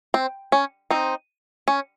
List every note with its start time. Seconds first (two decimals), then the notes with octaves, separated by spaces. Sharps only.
0.14 C4
0.52 C#4
0.90 C4 D#4
1.68 C#4